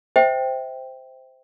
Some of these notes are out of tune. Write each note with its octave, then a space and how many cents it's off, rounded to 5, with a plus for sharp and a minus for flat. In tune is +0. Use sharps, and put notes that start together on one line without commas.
C5 -10 E5 -25 G5 +0